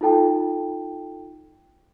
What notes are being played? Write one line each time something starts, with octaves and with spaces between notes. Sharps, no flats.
D#4 F4 A4 G5 A5